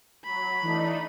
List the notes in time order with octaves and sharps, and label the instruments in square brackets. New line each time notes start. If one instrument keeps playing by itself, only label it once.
[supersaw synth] F#3 [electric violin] B5
[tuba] E3 [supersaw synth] A3 D4 D#4